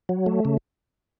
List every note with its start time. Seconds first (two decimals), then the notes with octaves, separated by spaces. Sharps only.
0.09 F#3
0.26 A3
0.45 C#3